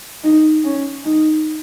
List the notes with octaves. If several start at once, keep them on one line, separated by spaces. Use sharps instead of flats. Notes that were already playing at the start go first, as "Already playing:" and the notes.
D#4
C#4
D#4